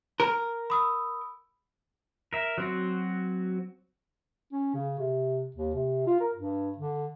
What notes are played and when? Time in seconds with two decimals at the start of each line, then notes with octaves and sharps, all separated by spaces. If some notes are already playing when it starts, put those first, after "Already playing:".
0.20 A#4
0.70 B5 D#6 E6
2.33 A#4 E5
2.58 F#3 C4 F#4
4.52 C#4
4.74 C#3
4.99 C3
5.56 D#2
5.74 C3
6.07 F4
6.20 A#4
6.34 G2
6.78 D3